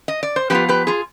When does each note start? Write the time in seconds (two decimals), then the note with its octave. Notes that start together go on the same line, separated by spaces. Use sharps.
0.08 D#5
0.23 D5
0.36 C5
0.50 F3 B3 F4 G4 B4
0.69 G4 B4
0.87 F4 G#4